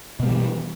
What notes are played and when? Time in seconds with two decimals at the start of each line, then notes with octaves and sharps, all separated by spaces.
0.20 B2
0.23 A#3
0.26 G3
0.29 E3